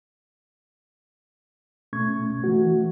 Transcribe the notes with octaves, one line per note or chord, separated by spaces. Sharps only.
B2 A3 C#4 C#6 G#6
E3 A3 F#4